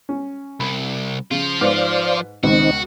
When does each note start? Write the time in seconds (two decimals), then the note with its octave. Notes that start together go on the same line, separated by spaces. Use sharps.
0.09 C#4
0.60 C2 B5
1.31 C#3 F3 F4
1.61 G#2 B4 C5 D5 F5
2.43 C#2 B2 D#3 C4 D#4 F#4